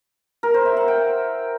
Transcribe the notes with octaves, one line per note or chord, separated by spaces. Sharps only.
A#4
C5
E5
F#5
G5